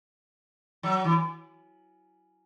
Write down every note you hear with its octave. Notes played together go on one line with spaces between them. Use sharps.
F#3
E3